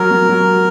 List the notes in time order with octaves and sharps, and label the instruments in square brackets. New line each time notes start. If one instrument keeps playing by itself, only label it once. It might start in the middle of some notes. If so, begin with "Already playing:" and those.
Already playing: [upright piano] F#3 [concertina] A#4
[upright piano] F#3
F#3